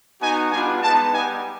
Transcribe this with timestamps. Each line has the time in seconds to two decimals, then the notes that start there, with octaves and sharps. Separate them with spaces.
0.22 B3 D#4 F#4 G#5
0.52 G3 B3 D4 F4 G#5
0.82 G#3 B3 D#4 A5
1.13 G3 B3 D#4 G4 G#5